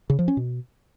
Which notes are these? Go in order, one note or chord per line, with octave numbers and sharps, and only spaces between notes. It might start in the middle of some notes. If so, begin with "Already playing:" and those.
C#3
F3
C#4
B2